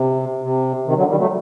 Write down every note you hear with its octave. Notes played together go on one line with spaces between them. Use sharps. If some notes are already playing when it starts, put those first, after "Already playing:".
Already playing: C3
C3
C3 D#3
D3 F#3
D#3 G3
F#3 A3